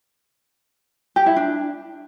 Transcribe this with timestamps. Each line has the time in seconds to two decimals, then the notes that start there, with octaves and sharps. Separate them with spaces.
1.16 G4
1.26 E4
1.36 D4